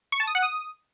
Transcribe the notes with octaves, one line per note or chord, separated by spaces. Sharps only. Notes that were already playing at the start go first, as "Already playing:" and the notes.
C#6
A5
D#6
F#5
D#6